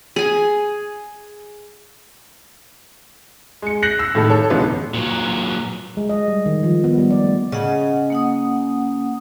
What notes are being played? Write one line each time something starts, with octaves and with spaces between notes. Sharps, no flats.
G#4 G#5
G#3 C#7
F#6 G6 A#6 C7 C#7 F#7
E6
A2 D#3 A4
A4 C#5
C#2 G#2 B2 D3 E3 B3
A#2 F#3
G#3
D#5
G3
D#3
F3
B3
G3
D5
A3
C#3 D#5 F#5
A#3 F#5 D#6